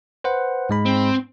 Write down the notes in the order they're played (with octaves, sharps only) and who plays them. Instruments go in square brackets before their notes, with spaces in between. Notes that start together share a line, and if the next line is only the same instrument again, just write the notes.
[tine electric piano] B4 C5 F#5
G#2 G#3 B5
[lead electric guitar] C4